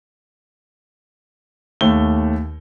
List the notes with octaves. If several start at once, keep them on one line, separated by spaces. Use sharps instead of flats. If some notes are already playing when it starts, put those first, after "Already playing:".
D#2 A3 G7